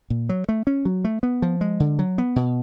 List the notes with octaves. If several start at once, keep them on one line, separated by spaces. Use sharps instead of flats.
A#2
F#3
A3
C#4
F#3
A3
B3
F3
G#3
D3
F#3
B3
B2